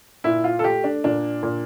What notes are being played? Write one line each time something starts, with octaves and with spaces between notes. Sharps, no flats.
A#2 E4
F4
A4
A3 G4
D4
A#2 D4
A#2